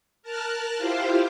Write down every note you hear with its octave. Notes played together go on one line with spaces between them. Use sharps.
A#4 A5 F6 F#6
E4 F4 G4 C5 F5